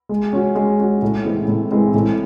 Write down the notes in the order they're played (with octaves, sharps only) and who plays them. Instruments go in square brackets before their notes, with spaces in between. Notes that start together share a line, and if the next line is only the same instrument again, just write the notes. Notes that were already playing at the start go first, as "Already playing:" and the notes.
[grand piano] G#3
C#4 F#4
G#3
C#4 F#4
A2
E3 G#3 C4
A2
E3 G#3 C4
A2